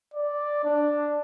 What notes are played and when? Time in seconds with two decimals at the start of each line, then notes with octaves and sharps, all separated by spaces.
0.14 D5
0.64 D4